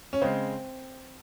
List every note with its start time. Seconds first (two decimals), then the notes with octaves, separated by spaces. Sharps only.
0.13 C#4
0.22 C#3 G#3 C4